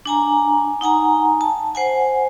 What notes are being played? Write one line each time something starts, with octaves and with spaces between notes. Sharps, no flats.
D4 G#5 A#5
D#4 F#5 G#5 A#5
A5
C5 F#5 G#5